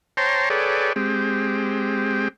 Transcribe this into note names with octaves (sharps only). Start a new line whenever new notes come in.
C5 C#5 G5 A5 A#5 C6
G#4 A4 B4 C#5 D5 G5
G#3 C4 G4